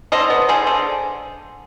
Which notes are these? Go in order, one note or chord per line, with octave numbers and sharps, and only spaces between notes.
D3 C5 D#5
B3
D3 G#4 C5
D3